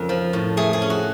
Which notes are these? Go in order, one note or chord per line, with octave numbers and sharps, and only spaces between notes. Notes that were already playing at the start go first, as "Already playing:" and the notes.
Already playing: F2 C#3 A#4
F3
A2
A3 G#4
G#4
C#4
F#4